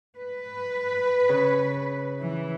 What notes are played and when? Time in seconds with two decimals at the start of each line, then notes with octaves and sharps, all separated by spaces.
0.16 B4
1.29 C#3
2.19 E3